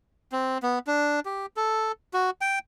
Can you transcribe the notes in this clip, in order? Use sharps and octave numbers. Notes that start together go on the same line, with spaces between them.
C4
B3
D4
G4
A4
F#4
G5